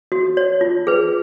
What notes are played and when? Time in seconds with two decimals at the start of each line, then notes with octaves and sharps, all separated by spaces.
0.12 F#4
0.37 C#5
0.61 F4
0.87 G#4 B4